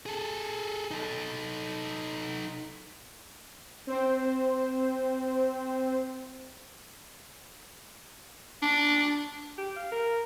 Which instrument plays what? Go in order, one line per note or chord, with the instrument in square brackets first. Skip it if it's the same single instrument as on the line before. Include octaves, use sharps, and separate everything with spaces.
[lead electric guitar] G#4 A4
D#4 A4
[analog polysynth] C4 C5
[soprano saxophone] D4
[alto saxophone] G4
F5
A#4